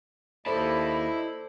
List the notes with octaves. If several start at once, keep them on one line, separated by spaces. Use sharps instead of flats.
D#2 E4 A4 C5 D5 D#5 A5 B5